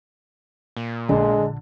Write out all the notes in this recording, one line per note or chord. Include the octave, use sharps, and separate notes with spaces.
A#2
A#1 D3 G#3